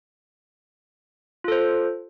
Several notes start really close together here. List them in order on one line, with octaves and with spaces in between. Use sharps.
F4 A4 C5